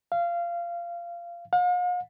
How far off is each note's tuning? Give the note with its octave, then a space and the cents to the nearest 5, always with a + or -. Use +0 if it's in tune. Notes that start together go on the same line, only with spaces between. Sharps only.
F5 -20
F5 +45